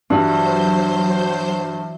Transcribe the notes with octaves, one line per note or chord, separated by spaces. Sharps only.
G2 E3 F#3 F#4 C5 G6